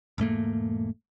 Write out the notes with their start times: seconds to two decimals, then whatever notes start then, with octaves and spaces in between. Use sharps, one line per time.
0.18 E1 G#2 A3 A#3